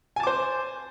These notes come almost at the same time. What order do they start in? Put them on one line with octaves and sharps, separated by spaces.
G#5 A5 D6 C5